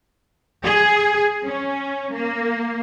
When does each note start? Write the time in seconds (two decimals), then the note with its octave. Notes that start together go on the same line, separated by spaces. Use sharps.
0.64 G#4
1.46 C#4
2.13 A#3